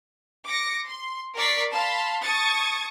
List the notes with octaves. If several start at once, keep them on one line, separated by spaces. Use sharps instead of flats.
D6 A#6 C#7 D7
C6
A#4 D5 C#6 B6 C7
F5 A5 B5 C6
A5 C#6 D#6 G#6 A6 C#7